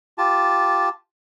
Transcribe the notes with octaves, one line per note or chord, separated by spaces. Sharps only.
F4 G4 A5